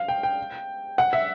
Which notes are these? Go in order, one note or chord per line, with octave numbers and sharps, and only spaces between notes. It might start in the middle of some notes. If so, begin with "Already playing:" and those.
Already playing: F5
G5
G5
F#5
E5